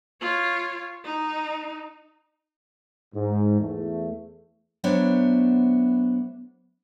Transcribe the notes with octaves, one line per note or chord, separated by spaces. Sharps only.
F4 C#5
D#4
G#2
E2 A3
F#3 A3 B3 D4 C5 C#5